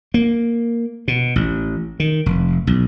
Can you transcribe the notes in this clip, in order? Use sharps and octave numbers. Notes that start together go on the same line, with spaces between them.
A#3
B2
A1
D#3
F1
B1